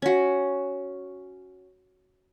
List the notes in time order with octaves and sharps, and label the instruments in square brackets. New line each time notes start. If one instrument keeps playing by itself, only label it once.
[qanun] C#4 F#4